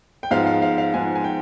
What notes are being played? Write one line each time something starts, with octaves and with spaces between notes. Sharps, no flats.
G5
G#2 F3 G#3 B3 F5
F5
F5
F5
G#2 F3 G#3 B3 G#5
G#5
G5